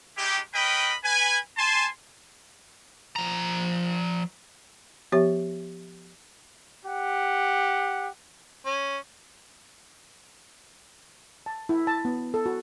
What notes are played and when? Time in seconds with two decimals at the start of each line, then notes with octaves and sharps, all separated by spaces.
0.18 G#3 D#4 E4 G4
0.54 C#4 A#4 B4 D#5 G5 B5
1.05 B4 G#5
1.58 G#5 A5 C6
3.16 F3 A#5
5.12 F3 B3 G4 C#5 E5
6.86 G4 F#5
8.66 C#4
11.46 A5
11.69 E4
11.87 A5
12.05 B3
12.34 A4
12.46 F#4